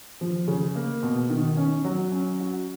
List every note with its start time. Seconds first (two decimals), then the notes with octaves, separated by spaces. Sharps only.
0.21 F3
0.48 C#3
0.75 A#3
1.03 B2
1.30 D#3
1.57 C#4
1.84 F#3
2.12 C#4
2.40 F#4